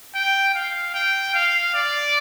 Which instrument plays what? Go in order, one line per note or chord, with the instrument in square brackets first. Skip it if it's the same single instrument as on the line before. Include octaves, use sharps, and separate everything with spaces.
[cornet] G5
F5
G5
F5
D5